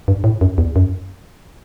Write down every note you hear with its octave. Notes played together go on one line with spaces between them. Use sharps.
G2
A2
F#2
E2
F#2